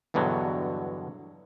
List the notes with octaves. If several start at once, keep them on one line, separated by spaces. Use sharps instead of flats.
E2 G2 B2 D3 F#3